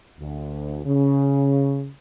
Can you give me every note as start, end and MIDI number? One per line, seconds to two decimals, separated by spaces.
0.19 0.80 38
0.86 1.89 49